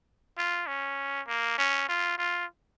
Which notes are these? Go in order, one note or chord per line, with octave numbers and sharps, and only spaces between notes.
F4
C#4
A#3
C#4
F4
F4